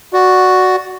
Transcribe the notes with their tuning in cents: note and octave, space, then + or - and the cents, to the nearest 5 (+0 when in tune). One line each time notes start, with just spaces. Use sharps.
F#4 +0 D5 +0